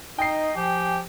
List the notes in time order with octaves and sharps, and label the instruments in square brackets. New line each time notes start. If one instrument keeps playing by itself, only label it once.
[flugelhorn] D#4 [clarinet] D#5 [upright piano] G5 C7
[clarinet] F3 [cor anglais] G4 [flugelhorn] G#5